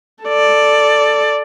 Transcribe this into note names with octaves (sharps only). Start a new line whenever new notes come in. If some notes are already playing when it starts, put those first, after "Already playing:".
A4 D5